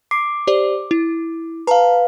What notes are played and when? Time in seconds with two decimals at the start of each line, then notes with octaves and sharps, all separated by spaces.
0.11 D6 C7
0.47 G4 C5 D5
0.91 E4
1.67 B4 F5 A5 A#5